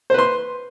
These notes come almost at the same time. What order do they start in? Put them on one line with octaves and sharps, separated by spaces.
C5 B4 C6